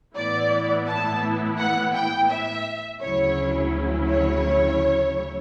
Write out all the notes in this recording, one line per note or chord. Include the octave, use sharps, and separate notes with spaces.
A2 E3 B3 E4 D5
A5
F#5
G5
E5
D2 C#3 F#3 C#4 E4 C#5
C#5